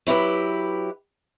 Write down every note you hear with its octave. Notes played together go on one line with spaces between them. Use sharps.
F#3 E4 G4 B4